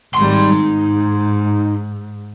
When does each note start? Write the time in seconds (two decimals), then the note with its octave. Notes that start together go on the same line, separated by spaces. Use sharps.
0.14 G#1 G3 D#4 C6
0.56 G#2